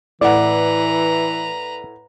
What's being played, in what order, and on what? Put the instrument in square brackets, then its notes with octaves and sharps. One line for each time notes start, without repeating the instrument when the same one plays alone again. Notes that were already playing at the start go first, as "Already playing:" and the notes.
[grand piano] A2 F#5 [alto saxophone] E3 [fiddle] B4 A#5 [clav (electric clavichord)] D5